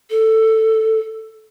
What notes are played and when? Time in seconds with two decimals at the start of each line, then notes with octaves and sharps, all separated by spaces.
0.11 A4